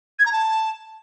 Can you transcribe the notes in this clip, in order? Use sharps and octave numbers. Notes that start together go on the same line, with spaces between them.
G#6
A#5
A5